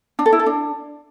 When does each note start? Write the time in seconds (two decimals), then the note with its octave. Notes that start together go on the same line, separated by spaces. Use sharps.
0.19 D4
0.26 A4
0.33 E4
0.39 A4
0.46 D4